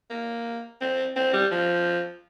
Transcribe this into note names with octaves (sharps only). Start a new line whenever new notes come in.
A#3
C4
C4
G3
F3